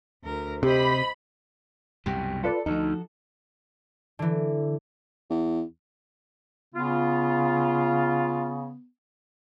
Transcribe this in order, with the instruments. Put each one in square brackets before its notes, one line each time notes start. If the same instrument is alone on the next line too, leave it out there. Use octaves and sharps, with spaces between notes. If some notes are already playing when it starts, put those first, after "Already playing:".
[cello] D2 A#4
[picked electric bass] C3 [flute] G4 [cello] C5 D#5 [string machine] B5
[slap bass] C2 F#2 B2 [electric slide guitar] G4
[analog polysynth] F4 B4 D5 [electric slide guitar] A4
[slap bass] D2 [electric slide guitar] F3 F#4 A4 [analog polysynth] D#4
[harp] D3 E3
[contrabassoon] E2
[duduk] C#3 [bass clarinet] B3 [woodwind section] F4